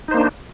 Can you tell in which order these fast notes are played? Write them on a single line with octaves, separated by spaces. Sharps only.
D#4 C5 A#3 D4